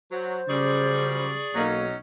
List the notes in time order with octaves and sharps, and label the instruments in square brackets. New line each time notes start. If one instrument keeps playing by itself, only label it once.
[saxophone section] F#3 [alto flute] C5
[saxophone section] F#2 F3 G3 [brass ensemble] C#3 [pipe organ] G#4 D5 C#6
[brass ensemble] B1 [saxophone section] F#3 C#4 D#4 [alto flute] A#3